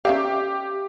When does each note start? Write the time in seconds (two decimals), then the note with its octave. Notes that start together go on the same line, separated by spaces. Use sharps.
0.05 C#4 G4 E5 F5